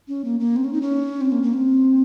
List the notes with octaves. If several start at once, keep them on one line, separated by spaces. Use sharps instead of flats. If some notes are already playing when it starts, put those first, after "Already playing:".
C#4
A#3
A#3
C4
C#4
D#4
C#4
C4
A#3
A#3
C4